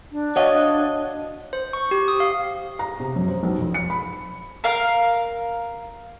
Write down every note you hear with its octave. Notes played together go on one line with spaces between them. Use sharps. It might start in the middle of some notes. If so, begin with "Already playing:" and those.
D4
F#4 C#5 D#5 F5 F#5
C5
C#6
G4
D#6
F5
A#5
C3
F#2
C5
B1
F2
C#7
B5
A#4 F5